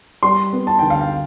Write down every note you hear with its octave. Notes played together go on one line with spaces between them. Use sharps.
G3 C6
B3
A5
D2 G5
F5
G5